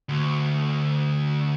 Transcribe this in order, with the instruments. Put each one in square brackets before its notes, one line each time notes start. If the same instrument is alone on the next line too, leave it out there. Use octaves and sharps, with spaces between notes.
[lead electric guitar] D2